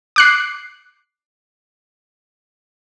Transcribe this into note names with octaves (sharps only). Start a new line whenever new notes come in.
D6 F#6 C7